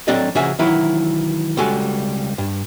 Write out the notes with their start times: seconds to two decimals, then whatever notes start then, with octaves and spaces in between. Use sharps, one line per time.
0.08 F#3 C4 D4 A4 D5 D#5
0.35 C#3 F3 F#4 G#4 E5 G#5
0.59 D#3 E3 F#3 E4
1.57 C#2 G3 G#3 F#4 A4 G#5
2.38 G2